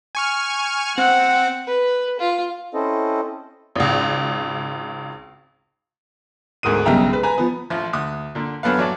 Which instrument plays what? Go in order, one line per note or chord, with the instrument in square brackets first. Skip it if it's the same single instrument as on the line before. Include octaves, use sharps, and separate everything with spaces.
[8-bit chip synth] G#5 C#6 F6
[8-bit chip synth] C4 [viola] F#5
[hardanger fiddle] B4
F4
[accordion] C4 C#4 E4 A4 C5 D#5
[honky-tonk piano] G#1 C#2
[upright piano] D2 G#2 A#4 D#6 D#7
B1 G2 C#3 G4 E5 A#5
G#3 B4
B4 G#5 A#5
F3 B3
[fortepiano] A1 F3 F4
D2 D#6
A#2 D3
F#2 F#3 B3 A4 B4 F5
A1 F#3 D5 A5